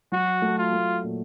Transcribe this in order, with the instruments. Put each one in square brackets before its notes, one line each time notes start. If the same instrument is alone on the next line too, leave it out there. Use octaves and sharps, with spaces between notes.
[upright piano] F#3 [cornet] F#4
[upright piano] A3
[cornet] F4
[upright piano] A3
A#2